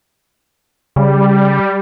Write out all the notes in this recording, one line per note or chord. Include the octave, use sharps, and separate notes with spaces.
C#3 G3